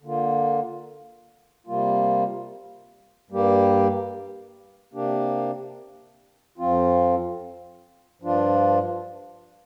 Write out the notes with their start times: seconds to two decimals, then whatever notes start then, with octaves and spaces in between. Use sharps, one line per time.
0.03 D3 A#3 F4
1.67 C3 G3 A#3 F4
3.30 G2 G3 A#3 G4
4.94 C3 A#3 D4 G4
6.58 F2 F3 C4 F4
8.22 G2 F3 D4 F4